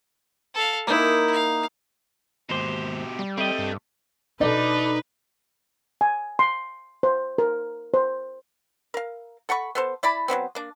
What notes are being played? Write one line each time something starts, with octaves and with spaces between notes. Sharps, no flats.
A4 F5
A#3 D#4 E4
F5
D#2 G#2 B2 G4 C5
G3
A3 C4 G4 D#5
G2
B2 D4 D#4 A4 B4 D5
G#5
C6
C5
A#4
C5
A#4 F5
A4 F#5 B5 C#6
B3 A4 C5
E4 D5 A5 B5
F#3 G3 B3 C4
A#3 D4